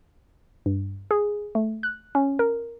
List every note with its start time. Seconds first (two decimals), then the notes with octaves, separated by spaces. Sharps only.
0.66 G2
1.11 G#4
1.55 A3
1.83 F#6
2.15 C#4
2.39 A#4